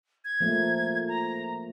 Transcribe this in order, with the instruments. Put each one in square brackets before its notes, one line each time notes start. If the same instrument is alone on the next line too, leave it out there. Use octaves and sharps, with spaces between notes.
[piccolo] G#6
[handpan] F3 A3 A#3
[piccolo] A#5